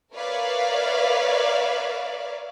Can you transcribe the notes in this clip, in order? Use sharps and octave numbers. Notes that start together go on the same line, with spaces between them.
A#4 B4 C#5 D5 E5 F5